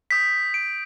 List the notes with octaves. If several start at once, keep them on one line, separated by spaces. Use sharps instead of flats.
D#6 G6 B6
D7